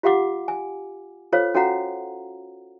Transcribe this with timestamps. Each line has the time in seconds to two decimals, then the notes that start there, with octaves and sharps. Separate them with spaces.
0.03 F4 G4 F5 F#5 D6
0.48 G#5
1.32 F4 A4 C5 C#5 F5
1.54 C#4 F#4 A4 F5 F#5 A#5